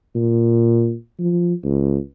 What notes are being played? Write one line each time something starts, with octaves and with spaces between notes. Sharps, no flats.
A#2
F3
C#2